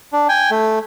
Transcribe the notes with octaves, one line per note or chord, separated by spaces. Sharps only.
D4
G5 G#5
A3